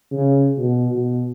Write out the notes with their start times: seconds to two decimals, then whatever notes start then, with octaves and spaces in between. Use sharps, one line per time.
0.12 C#3
0.58 B2
0.91 B2